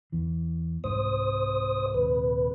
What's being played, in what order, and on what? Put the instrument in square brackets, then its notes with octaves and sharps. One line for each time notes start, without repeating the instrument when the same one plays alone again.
[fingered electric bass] E2 E3
[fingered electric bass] C2 G#2 [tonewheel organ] C5 D#6
[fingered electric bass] D#1 C3 [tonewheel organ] B4